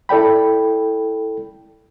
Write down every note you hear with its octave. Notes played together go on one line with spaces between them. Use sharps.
E4 A4 D5 G5 B5